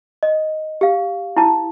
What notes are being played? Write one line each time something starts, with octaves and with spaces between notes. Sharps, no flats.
D#5
G4 F5
E4 A5